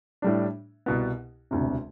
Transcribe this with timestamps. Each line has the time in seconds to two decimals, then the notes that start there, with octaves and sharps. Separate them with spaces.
0.22 A2 G3 D4
0.86 C2 B2 B3
1.51 E1 D2 C3